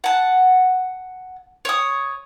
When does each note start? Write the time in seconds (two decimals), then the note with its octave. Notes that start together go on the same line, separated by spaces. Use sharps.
0.04 F#5 A5
1.65 C#5 D#6